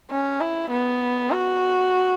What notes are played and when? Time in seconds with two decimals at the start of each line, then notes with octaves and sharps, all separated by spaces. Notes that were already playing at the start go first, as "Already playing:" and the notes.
0.10 C#4
0.40 E4
0.70 B3
1.31 F#4